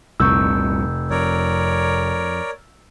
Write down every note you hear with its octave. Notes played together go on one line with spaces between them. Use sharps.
F1 C2 A#2 C#6 E6 G6
F2 A#4 C#5 D5